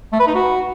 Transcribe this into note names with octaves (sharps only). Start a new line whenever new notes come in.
A3
B4
D#4
F#4